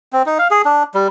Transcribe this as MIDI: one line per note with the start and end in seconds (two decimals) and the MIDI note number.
0.13 0.22 60
0.26 0.38 63
0.39 0.48 77
0.51 0.62 68
0.65 0.83 62
0.94 1.08 55